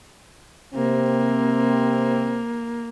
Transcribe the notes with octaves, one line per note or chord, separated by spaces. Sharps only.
C3 A#3 C4